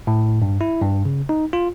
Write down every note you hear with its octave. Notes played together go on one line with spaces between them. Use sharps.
A2
G2
E4
G2
C#3
D#4
F4